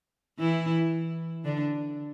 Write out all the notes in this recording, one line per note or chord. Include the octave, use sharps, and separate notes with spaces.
E3 E4
D3 D4